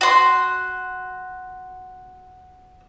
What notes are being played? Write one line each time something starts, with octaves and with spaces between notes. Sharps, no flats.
F#4 C6